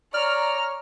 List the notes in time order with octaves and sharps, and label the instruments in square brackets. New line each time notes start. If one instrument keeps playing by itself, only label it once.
[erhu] C#5 [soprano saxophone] D5 [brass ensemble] A#5 [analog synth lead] F6